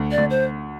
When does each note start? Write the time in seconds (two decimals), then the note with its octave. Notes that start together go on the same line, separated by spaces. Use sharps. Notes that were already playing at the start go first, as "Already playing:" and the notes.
Already playing: D2
0.11 D5
0.18 D2
0.30 C5